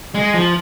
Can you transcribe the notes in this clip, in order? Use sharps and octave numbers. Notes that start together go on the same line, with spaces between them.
G#3
F3